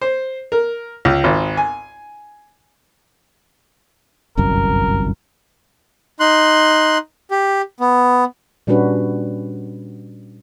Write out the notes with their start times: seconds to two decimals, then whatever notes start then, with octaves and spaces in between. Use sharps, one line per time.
0.01 C5
0.52 A#4
1.05 C#2
1.24 G#1
1.57 G#5
4.37 G1 C2 F#2 A#4
6.20 D#4 C6 F#6
7.31 G4
7.80 B3
8.67 A#2 G3 C#4 D4 F#4 B4